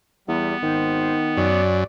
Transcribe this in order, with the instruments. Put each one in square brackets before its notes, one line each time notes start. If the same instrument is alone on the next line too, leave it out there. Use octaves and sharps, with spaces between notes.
[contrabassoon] E2 [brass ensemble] G3 [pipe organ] B3
[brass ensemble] G#1 C5 [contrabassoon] D#3
[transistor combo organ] F#2 [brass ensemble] D5